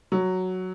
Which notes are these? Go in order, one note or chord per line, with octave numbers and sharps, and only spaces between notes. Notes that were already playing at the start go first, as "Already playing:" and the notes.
F#3